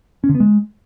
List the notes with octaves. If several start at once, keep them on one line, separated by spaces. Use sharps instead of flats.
C#4
D3
B3
G#3